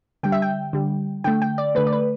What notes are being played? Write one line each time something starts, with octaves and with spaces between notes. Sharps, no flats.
D3 G3 G5
E5
G5
D3 G3
D3 A3 G5
G5
D5
D3 A3 B4
D5
B4